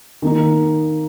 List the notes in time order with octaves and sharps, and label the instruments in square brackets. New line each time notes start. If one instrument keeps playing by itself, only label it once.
[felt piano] D#3 A#3 D#4